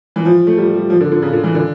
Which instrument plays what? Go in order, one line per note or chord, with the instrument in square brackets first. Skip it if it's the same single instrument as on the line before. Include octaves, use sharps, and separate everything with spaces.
[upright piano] E3
F3
A3
G3
G3
F3
D3
D3
C#3
D3
E3
D3